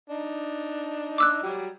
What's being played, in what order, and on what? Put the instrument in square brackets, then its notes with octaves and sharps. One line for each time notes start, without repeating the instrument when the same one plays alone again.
[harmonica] D4 D#4
[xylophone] D6 E6 F#6
[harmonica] F#3 G3 G4